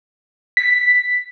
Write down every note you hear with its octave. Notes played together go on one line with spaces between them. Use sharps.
B6